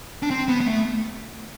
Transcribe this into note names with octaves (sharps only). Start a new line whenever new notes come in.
D4
C4
B3
B3
A3